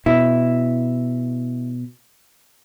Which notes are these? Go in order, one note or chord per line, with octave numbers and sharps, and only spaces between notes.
B2 E4